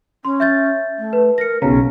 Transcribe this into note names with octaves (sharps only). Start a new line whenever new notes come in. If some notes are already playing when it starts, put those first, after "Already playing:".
C#4 C6
E5 G6 A6
A3
B4
A#4 A#6 C#7
B1 C#3 C#4 A#5